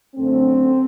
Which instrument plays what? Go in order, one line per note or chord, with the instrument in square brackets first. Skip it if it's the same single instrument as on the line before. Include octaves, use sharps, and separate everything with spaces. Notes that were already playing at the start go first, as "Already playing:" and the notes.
[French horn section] F#2 D3 A3 C4